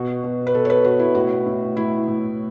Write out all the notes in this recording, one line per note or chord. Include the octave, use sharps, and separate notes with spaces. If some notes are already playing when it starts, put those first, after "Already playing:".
Already playing: B2 F#4
B2
B4
B2 A4
C#5
B4
B2 F#4
E4
A2 F#4
A2
A2 E4
A2